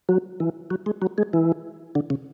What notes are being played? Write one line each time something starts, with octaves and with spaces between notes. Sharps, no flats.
F#3
E3
F#3
G#3
F#3
G#3
E3
D3
C#3